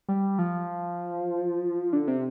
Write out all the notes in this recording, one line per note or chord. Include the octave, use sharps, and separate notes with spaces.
G3
F3
D3
C3